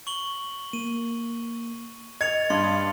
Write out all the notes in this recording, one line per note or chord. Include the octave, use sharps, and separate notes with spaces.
C#6 F#7 G7
A#3 D#7
D#5 G#6 A6 C#7 F7
G2 C6
D#6